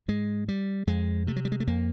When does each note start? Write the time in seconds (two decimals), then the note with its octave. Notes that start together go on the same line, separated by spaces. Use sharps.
0.08 G#2 G#3
0.48 G3
0.87 F2 G#3
1.27 C3 A3
1.36 F#3
1.45 G3
1.52 G#3
1.60 A3
1.67 F2 A#3